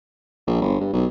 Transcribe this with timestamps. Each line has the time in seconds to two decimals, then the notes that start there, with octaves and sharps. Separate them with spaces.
0.47 A#1
0.61 G1
0.81 G2
0.94 B1